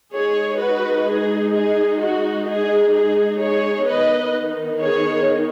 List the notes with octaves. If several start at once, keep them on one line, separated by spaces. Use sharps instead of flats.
G#3 D#4 G#4 C#5
F#4 B4
G#4
G#4
F#4
G#4
G#4
G#4 C#5
D#3 B3 D#4 B4 D#5
G#4 C#5